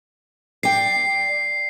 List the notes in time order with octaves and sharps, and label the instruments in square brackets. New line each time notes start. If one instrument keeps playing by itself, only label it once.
[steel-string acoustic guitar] D5 G5 [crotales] C7